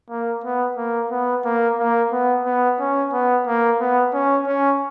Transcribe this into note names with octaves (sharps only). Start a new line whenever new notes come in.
A#3
B3
A#3
B3
A#3
A#3
B3
B3
C#4
B3
A#3
B3
C#4
C#4